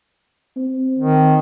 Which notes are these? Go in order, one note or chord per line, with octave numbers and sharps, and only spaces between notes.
C4
D#3